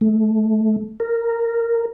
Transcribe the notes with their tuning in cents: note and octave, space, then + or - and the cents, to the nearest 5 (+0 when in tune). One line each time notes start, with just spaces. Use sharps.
A3 -20
A#4 -10